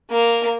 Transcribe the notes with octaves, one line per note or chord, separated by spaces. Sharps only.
A#3